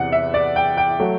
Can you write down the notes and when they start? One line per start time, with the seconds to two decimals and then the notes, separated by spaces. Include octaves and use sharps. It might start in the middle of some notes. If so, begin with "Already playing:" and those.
Already playing: E2 C3 E3 F#5
0.12 E5
0.34 D5
0.56 G5
0.77 G5
1.00 F#3 A3